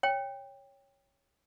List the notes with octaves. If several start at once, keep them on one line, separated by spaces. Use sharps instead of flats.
C#5 G5